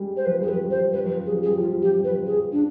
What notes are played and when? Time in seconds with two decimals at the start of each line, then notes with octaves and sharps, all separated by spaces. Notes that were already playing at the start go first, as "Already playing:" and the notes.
Already playing: G3 G#3
0.17 C5
0.26 F3 B4
0.39 G3 G#4
0.48 B4
0.53 F3
0.65 G3
0.71 C5
0.79 F3
0.92 G3 B4
1.05 F3 B4
1.19 G3
1.26 G#4
1.32 F3
1.43 G3 G#4
1.57 F3 F4
1.71 G3
1.82 F3 G4
1.98 G3
2.04 B4
2.11 F3
2.27 G#4
2.52 D4